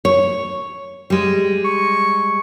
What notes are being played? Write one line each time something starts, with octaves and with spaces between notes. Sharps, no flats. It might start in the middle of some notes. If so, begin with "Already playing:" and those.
C#5
G3 G#3
C#6